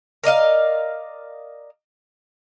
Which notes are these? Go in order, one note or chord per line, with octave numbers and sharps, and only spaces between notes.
A#4 D5 D#5 F5